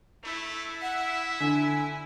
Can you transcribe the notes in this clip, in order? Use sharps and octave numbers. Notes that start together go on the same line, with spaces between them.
A3 E4
E5 F#5
D3 G#5